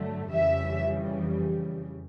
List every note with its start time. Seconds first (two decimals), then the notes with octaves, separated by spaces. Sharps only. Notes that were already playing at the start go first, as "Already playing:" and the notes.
Already playing: G2 D3 F#3 A3
0.33 F2 C#3 E3 G3 E5